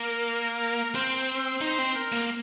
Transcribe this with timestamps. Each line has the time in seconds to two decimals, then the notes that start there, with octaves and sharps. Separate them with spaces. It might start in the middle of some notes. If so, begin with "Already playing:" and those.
Already playing: A#3 A#4
0.95 C4 C5
1.61 D#4 C5
1.78 C4
1.95 A#4
2.12 A#3